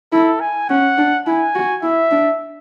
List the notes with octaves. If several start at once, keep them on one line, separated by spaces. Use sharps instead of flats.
E4 A4
G#5
C#4 F#5
D4
E4 G#5
F#4
E4 E5
D4